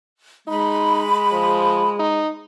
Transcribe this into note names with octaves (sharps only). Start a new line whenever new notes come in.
G#3 D#4 B5
F3
D#4